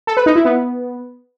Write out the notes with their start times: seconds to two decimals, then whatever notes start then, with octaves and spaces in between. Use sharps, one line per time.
0.07 A4
0.17 B4
0.26 D#4
0.36 E4
0.45 B3